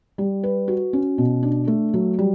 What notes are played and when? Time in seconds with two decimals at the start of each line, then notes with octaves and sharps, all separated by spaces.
0.18 G3
0.43 B4
0.68 F#4
0.93 C#4
1.18 B2
1.43 D4
1.68 A3
1.94 F#3
2.19 G3